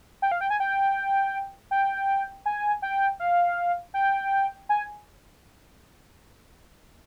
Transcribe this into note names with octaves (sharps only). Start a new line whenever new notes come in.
G5
F5
G5
G#5
G5
G5
G#5
G5
F5
G5
G#5